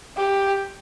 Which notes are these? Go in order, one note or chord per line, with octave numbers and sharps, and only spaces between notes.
G4